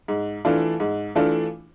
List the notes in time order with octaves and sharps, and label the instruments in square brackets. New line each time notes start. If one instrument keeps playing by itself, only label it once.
[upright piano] G#2
E3 A3 D4 F4
G#2
E3 A3 D4 F4